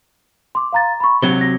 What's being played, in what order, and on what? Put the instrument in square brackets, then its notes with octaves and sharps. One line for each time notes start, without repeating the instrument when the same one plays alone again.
[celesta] C6 D6
F5 A#5 A6
B5 C#6
[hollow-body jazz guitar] C3 F#3 [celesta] G7
[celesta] A#6